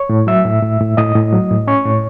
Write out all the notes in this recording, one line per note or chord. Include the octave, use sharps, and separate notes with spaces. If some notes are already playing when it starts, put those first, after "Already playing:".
Already playing: C#5 C#6
A2
F#3 E5 E6
A2
A2
A2
A2 D#5 D#6
A2
F#3
A2
C#4 C#5 C#6
A2